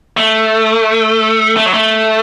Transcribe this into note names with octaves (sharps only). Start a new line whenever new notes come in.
A3
A3
F#3
A3